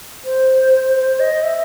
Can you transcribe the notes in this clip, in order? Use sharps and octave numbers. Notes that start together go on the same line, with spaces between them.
C5
C5
D#5
E5